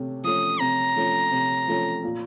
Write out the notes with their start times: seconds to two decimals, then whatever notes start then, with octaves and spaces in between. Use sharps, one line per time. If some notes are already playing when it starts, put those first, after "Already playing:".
Already playing: C3 A3 C#4
0.24 F3 A3 C#4 D#6
0.60 C3 A#5
0.96 F3 A3 C#4
1.32 C3
1.68 F3 A3 C#4
2.04 A#2